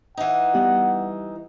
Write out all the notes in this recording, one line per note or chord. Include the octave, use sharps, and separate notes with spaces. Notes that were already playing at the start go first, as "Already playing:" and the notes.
E3 D#4 F#5
G3 B3 G4